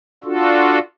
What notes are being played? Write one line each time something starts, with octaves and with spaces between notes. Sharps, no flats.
D4 F4 F#4 A4